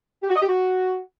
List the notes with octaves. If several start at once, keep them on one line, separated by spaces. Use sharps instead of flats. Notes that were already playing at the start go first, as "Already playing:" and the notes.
G4
F#4
D#5
G4
F#4